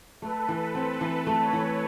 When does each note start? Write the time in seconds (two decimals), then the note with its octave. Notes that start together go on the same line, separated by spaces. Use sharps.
0.22 A3 A4 B4
0.49 E3
0.75 C4
1.01 E3
1.27 A3
1.39 B4 C#5
1.53 E3